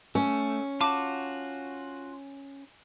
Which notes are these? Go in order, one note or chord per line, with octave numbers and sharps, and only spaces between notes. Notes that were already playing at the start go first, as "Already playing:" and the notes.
A3 C#4
F4 F#4 A5 D6